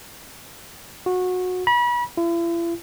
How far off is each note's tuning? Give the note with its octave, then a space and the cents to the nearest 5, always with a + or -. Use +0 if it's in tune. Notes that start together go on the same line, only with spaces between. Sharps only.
F#4 -20
B5 -35
E4 +45